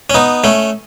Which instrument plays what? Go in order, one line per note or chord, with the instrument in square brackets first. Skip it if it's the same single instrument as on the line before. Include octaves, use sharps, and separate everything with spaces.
[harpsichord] C#4
B3 D#4
A3 C#4